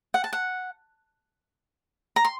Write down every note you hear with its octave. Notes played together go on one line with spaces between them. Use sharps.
F#5
A5
F#5
A#5
C6